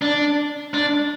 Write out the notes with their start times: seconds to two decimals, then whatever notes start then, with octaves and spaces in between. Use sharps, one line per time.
0.02 D4
0.74 D4